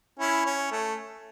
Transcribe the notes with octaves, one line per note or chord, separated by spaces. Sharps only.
C#4 E4
C#4
A3